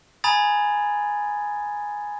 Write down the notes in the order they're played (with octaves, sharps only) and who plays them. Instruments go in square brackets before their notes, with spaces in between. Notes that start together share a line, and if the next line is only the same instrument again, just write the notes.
[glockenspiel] G#5 A#5 B5 D#6 G#6 A6